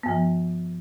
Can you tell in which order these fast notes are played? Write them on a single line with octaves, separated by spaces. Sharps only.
B3 G2 F3